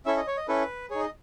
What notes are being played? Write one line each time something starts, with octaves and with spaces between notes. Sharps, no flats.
C#4 E4 A4 E5
D#5
C#5
D#5
C#4 E4 A4 B4
D#4 G#4 C#5
D#5